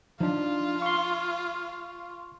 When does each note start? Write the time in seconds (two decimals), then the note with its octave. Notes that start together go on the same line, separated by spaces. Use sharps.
0.20 F3 D4 D#4 F4
0.82 C6 C#6